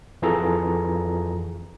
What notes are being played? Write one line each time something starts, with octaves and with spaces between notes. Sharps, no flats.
F2 E3 F4 G#4 A4 A#5